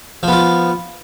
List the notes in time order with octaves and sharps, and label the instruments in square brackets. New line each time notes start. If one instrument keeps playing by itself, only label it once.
[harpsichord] F3
B3
F4